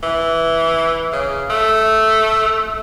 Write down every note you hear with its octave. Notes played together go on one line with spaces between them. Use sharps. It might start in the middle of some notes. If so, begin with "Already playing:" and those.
E3
C#3
A3